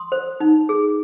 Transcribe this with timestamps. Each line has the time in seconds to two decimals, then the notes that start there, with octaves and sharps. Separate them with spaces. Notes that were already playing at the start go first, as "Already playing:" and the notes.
Already playing: C6 D#6
0.12 C5
0.40 D#4
0.69 G#4